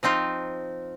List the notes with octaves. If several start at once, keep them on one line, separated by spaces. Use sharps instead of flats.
F3 C4 D#4 F4